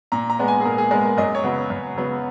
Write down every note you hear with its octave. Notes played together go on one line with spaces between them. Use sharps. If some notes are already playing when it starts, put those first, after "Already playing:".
A#2 A#5
A#5
G#3 B3
G#5
G#4
A#2 A#4
G#4
G#3 B3 A#4
A#4
F#2 D#5
C#5
C#3 F#3 B3
F#2
C#3 F#3 B3